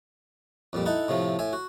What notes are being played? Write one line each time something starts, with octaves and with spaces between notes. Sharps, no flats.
F2 A#2 G3
D#4 E4 A4 F#5
A2 C3 F3 A3
A2 E5 G#5
F#4